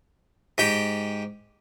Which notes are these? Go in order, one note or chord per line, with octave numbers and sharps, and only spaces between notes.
G#2 G4 G5